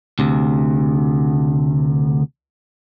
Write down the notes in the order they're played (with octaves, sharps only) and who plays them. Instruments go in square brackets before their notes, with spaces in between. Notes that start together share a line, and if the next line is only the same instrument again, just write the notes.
[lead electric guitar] D2 C3